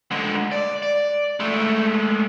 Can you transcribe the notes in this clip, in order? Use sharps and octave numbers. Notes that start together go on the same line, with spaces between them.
D3 G#3
D5
D5
G#3 A3